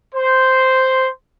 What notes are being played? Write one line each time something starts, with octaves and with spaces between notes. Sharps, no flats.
C5